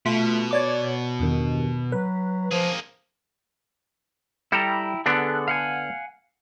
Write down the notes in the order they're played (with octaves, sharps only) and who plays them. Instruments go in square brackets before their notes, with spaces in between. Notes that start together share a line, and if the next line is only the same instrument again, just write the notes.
[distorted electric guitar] B2 [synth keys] A3 F4 B6
[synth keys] C#5 D5 D6
E2 G2 D#3
[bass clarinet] F#3 [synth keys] B4
[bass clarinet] F3 [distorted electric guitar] A#3 G#4
[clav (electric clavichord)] G3 A4 [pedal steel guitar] E4 G5 A#5
[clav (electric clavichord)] D3 B3 D4 [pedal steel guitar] G#4 A4 F#5
[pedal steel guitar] F5 F#5 G#5